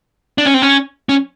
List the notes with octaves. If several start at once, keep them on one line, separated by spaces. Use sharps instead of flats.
D4
C#4
C4
C#4
C#4